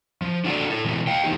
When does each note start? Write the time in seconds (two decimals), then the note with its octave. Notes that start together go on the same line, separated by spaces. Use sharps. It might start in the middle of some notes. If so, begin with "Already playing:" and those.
0.22 F3
0.44 D4 F4 F#4 A4 D5 F#5
0.70 E4 A4
0.85 B2 E3 A3
1.07 F5 G5
1.24 E3 G3 D#4 G4